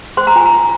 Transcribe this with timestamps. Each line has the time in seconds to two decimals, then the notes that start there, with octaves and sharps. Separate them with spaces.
0.17 C5 C6
0.27 A#5
0.36 F4 G#5
0.46 A#5
0.53 F4